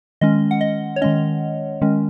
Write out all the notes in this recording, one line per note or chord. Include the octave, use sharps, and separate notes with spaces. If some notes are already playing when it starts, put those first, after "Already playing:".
D#3 G#3 C#4 D#5
F#5
D#5
C#5
D#3 G#3 C#4 D#5
D#3 G#3 C#4